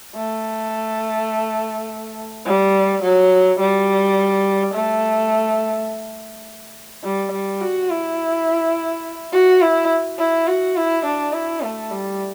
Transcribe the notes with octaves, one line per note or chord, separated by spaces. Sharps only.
A3
G3
F#3
G3
A3
G3
G3
F#4
E4
F#4
E4
E4
F#4
E4
D4
E4
A3
G3